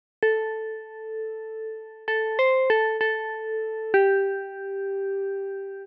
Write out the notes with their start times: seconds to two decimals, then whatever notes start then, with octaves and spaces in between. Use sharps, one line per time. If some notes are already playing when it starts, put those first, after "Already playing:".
0.23 A4
2.08 A4
2.39 C5
2.70 A4
3.01 A4
3.94 G4